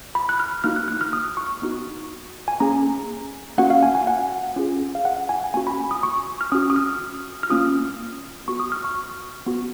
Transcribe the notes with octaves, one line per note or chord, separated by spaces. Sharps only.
B5
F#6
F6
A#3 D#4 F#4 F6
F#6
F#6
F6
D#6
C#6
B3 D#4 F#4
G#5
A#3 C#4 G#4 A#5
A#3 C#4 F#4 F#5
F5
G#5
G#5
F#5
C#4 F4 G#4
F5
F#5
G#5
A#3 C#4 F#4 G#5
B5
D#6
C#6
F6
C#4 F#4 D#6
D#6
F6
F6
A#3 C#4 F4 D#6
B3 F#4 C#6
D#6
F6
C#6
B3 F#4